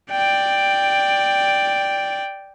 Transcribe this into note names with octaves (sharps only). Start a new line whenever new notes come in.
D5 G5